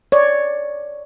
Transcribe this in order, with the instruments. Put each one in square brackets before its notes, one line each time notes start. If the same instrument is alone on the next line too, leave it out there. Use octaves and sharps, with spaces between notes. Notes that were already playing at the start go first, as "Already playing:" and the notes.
[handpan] C#5 D5